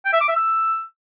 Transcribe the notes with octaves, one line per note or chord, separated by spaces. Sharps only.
G5
E5
D6
E5
E6